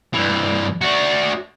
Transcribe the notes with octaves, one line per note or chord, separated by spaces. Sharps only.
G2 E3
D4 F#4